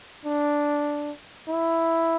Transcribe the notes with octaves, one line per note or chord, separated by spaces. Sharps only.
D4
E4